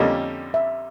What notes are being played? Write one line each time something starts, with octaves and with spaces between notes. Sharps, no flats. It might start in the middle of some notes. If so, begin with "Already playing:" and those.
Already playing: F2 D3 G3 A#3 C#4 D#5
E5